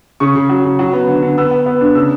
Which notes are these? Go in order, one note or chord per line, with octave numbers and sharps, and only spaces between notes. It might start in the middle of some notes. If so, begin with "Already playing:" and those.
C#3 C#6
C#3
F#3
C#3
F#3
B3
D3
D3
B3 E6
B3
B3
D4
C#3 E6